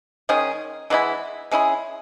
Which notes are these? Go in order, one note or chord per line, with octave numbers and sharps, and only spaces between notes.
D#3 G#3 C#4 G#4
E3 G#3 B3 E4
G#3 C#4 E4 G#4